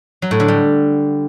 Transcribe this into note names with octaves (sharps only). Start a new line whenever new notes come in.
F#3
A2
D3
G3